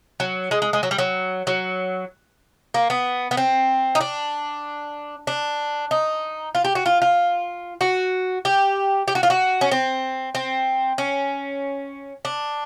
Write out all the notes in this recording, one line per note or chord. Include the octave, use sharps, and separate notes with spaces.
F#3
G#3
G#3
G#3
F#3
G3
F#3
F#3
A#3
B3
B3
C4
D#4
D4
D4
D#4
F4
G4
F#4
F4
F4
F#4
G4
G4
F#4
F4
F#4
C#4
C4
C4
C#4
D4